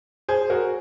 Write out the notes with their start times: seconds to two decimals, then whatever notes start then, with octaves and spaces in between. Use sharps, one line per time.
0.29 G#4 C5
0.50 F#4 A#4